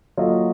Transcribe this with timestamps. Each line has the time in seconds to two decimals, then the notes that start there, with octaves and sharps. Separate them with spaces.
0.17 F#3 A#3 F4 A4 D#5